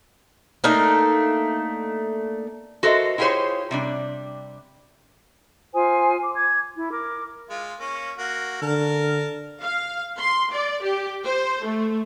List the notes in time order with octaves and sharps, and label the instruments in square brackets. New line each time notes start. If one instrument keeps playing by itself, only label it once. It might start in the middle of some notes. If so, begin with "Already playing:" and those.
[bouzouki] A3 A#3 D4 D#4
[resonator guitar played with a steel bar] F#4 A4 A#4 C5 D#5 E5
E4 F4 G4 G#4 C5 C#5
C3 G3 D4
[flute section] F4 C5 G#5 D#6
D6
D6 G#6
E4
A#4 D6
[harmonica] G#3 F4
A#3 C#4
A#3 F#4
[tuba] D3 [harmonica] A#4 A5 F6
[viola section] F5
C6
D5
G4
C5
A3